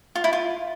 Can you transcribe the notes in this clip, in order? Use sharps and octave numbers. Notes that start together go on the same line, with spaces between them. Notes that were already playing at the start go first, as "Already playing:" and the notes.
F4
E4
F4